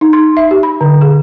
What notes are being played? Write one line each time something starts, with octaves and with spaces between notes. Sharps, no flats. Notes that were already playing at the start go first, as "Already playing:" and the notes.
D#4
C6
E5
G4
B5
D3
G#4